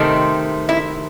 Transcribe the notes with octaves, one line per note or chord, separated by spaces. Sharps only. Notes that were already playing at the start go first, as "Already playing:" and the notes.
Already playing: C3 D#3 A3 C4
E4